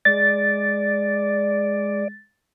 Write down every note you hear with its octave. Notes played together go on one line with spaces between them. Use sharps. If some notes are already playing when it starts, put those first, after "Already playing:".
G#3 D5 A6